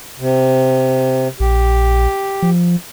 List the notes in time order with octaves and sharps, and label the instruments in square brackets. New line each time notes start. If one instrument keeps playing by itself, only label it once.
[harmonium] C3
[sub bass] A#1 [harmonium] G4
[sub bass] F3